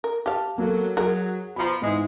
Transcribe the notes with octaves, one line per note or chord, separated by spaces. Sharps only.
A#4
G4 F5 A5
F#3 A#3 A4
F#3 G#4 A#4 F#5
B2 F3 A#5 B5
G#2 E3 G#3